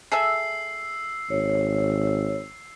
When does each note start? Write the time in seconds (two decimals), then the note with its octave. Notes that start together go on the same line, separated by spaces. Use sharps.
0.12 G#4 A4 E5 E6 C7
1.30 G#1 C#5